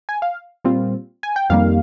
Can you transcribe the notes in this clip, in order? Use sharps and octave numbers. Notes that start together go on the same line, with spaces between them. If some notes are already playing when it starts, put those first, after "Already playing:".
G#5
F5
A#2 G3 C4 F4
G#5
G5
F2 D#3 G3 A#3 F5